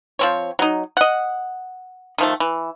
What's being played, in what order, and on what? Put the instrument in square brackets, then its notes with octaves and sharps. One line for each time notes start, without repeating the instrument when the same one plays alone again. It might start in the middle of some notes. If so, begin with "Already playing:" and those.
[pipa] F3 C4 C#5
F#3 D#4
D#5 F#5
D#3 F3 A3
E3